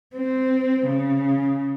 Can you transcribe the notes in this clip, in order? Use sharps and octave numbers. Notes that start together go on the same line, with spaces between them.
C4
C#3